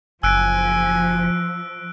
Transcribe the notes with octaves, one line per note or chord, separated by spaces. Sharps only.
F#1 F3 G#5 E6 F#6 D7